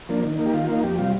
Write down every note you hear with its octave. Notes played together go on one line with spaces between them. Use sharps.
F3 A#3 D4
D#3
A#3 D#4
G4
D#3 F4
A#3 D#4
F2 G4
C3 G3 F4